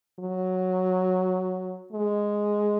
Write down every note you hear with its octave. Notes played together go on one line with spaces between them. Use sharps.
F#3
G#3